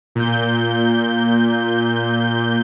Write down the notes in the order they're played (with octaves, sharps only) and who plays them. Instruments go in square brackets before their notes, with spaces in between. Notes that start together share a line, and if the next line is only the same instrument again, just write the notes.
[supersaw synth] A#2 G6